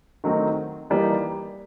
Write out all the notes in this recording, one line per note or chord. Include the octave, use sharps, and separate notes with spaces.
D#3 F#3 A3 C4 D#4
E3 G3 A#3 D#4